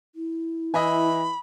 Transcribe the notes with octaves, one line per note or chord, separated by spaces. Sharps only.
E4
E3 D#5 E5 G#5 B5